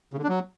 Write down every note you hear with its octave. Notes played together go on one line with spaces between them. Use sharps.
C#3
D3
D4
F#3